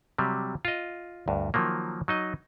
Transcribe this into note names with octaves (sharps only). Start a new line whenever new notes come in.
C3 F#3 G3
F4 D#5
D2 G2
D#3 F3 F#3 A#3
F#3 D#4 D#5